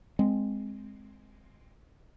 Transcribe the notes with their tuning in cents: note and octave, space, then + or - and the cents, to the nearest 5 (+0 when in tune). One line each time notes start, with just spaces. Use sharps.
G#3 +0 C4 +0